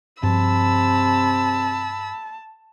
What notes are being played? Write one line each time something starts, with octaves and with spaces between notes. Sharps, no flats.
G2 C3 F3 A5 B5 E6